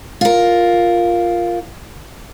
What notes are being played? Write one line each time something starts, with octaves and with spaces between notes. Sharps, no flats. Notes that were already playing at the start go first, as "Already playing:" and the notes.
F4 A#4